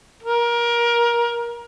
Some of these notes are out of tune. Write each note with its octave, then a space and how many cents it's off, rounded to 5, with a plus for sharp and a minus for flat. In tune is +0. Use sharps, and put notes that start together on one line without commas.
A#4 +25